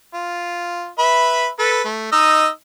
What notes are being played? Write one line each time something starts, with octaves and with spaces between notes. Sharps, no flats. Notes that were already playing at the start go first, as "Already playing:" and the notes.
F4
B4 E5 B5
A4 B4
A3
D#4 D#5 E6